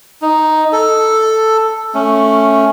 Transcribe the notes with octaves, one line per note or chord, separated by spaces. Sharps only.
D#4
A4
A3 C#4